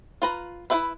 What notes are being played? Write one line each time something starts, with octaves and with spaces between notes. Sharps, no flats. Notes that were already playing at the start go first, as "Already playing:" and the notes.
F4 B4 A#5
E4 F#4 B4 E5 B5